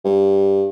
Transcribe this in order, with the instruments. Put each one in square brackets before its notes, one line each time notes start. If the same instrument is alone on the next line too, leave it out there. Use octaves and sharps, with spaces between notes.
[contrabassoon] G2